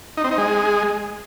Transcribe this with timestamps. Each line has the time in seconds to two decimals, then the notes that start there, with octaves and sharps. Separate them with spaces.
0.17 D#4
0.24 C4
0.31 D#4
0.38 G#3